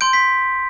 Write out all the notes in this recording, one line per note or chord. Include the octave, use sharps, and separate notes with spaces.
C6 G6 D7
B6